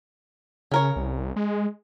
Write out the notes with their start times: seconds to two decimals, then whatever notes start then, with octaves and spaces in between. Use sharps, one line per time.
0.72 C#3 C#4 A#4 C#5
0.96 C2
1.36 G#3